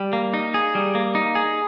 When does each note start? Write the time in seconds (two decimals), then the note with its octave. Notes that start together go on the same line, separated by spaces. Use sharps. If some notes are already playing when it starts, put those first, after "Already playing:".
Already playing: G3
0.13 A#3
0.34 D#4
0.54 G#4
0.75 G3
0.95 A#3
1.15 D#4
1.35 G#4